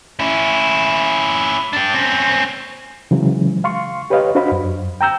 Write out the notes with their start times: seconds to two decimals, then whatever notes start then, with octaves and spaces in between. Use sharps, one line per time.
0.20 C#4 E4
1.73 D4 G4
1.94 C4 C#4
3.11 C#3 E3 F#3 G#3
3.64 F5 C6 C#6
4.10 G4 B4 C#5 D#5 F5
4.35 D4 F#4 C5 D#5 F5 B5
4.52 F#2
5.01 G5 A#5 E6 G6